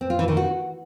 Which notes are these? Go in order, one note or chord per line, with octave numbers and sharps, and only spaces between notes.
C4
F4
E3
D#3
F#4